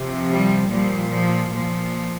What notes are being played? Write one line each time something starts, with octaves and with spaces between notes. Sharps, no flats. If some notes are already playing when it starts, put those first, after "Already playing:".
Already playing: C3 F3
G3
A#2 F3 G3
F3
A#2 F3